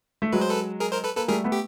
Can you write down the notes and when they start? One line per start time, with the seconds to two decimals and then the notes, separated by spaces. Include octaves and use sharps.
0.22 A3
0.33 F#3 G#3 B4
0.41 C5
0.50 A4 B4
0.80 G#4 A#4
0.92 A#4 C5
1.04 A4 B4
1.16 A#3 A4 B4
1.28 G3 A3 G#4 A#4
1.44 A3 B3
1.52 G4